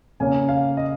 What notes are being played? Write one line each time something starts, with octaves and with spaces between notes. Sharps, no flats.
C#3 A#3 C#4 G#5
F5
D#5